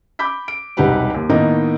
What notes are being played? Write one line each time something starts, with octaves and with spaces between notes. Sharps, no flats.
B5 D6 G6 B6
D7
E1 C2 D#4 G4 B4 F#5
D#2
A2 D#3 A#3 B3 D#4 D#5